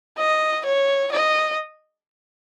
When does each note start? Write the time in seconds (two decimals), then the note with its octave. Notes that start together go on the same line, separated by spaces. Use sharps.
0.19 D#5
0.66 C#5
1.12 D#5